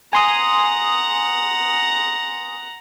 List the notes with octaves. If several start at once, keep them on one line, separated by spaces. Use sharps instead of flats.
F#5 G#5 A#5 C6 D#6